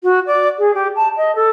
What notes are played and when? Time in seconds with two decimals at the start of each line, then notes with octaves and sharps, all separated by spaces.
0.03 F#4
0.26 D5
0.58 G#4
0.74 G4
0.96 A5
1.17 D#5
1.35 A4